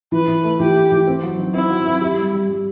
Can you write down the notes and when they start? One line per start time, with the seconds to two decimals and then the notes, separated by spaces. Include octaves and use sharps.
0.12 E3 B4
0.28 E3
0.44 A3
0.60 E3 G4
0.75 A3
0.92 E3
1.07 C4
1.23 F#3
1.39 D#3
1.54 C4 E4
1.70 F#3
1.86 C4
2.01 G4
2.18 G3
2.34 G3
2.49 G3